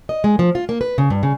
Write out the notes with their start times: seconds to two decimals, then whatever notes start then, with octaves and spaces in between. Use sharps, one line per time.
0.09 D#5
0.24 G#3
0.39 F3
0.55 F4
0.69 A#3
0.81 B4
0.98 C#3
1.10 G2
1.23 C#3